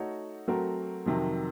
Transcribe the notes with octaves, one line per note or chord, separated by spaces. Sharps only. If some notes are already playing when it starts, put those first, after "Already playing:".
Already playing: A3 D#4 F#4 A4 C#5
F#3 A3 C4 F#4 A#4
F2 C3 D#3 F#3